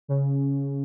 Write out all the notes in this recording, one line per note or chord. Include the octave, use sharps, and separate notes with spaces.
C#3